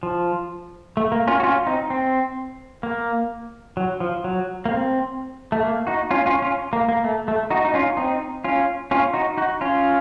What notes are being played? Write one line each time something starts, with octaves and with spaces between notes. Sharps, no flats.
F3
A3
A#3
C#4 F4
F#4
C#4 F4
C4 D#4
C4
A#3
F#3
F3
F#3
A#3
C4
A3
A#3
D#4 F#4
C#4 F4
C#4 F4
C#4 F4
A#3
A#3
A3
A3
D#4 F#4
D#4
C#4 F4
C4 D#4
C#4 F4
C#4 F4
D#4 F#4
D#4 F#4
C#4 F4